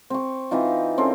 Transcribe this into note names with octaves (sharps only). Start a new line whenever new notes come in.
C4 C#6
E3 C4 D#4 F4
C4 C#4 A4 A#4